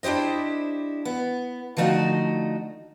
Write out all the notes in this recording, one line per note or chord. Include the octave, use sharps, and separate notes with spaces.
D4 E4 G4 C5 D#5
B3
D3 F3 A3 D#4 F#4